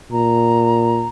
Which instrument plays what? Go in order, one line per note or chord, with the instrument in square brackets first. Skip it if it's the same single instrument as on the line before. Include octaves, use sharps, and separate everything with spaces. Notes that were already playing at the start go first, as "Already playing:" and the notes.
[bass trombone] A#2 [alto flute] A#5